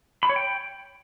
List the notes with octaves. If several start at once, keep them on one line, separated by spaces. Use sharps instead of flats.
B5
C#5
G5